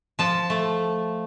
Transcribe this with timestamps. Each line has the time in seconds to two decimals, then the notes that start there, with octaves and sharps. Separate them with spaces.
0.19 F3 A5
0.50 A3